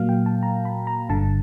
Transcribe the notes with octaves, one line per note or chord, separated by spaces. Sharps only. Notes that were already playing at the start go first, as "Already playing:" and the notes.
Already playing: A#2 F#3 A#3 F5
G5
A5
A#5
B5
A#5
G1 G2 D3 A5